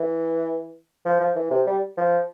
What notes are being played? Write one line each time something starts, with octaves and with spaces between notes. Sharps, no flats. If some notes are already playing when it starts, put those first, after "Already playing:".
Already playing: E3
F3
F3
E3
C3
G3
F3